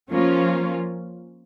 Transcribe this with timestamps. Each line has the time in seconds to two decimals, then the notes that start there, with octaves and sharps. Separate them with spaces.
0.10 F3 A#3 C#4 F4